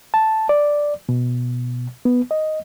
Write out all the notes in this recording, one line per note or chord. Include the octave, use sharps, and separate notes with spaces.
A5
D5
B2
B3
D#5